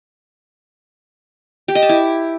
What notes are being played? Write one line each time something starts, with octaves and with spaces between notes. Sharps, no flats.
G4
D#5
A5
E4